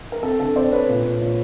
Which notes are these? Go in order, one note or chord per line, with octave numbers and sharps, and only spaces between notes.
A#4
C4 A4
D3 A4
C4 C5 D5
C4 B4 C#5
A#2
A#2
A#2